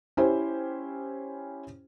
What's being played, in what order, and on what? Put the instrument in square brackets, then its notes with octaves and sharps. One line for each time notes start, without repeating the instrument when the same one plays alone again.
[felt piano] C#4 E4 G4 C5